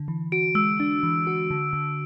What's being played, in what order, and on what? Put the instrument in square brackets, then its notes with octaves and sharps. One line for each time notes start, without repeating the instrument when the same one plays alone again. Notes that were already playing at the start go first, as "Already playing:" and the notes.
Already playing: [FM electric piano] D3
E3
[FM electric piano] F#4 [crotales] D7
[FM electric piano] G#3 [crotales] E6
[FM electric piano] D4
E3
F#4
D3
D3